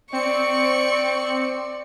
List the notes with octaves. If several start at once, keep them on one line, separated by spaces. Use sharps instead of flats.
C4 D5 C#6 C#7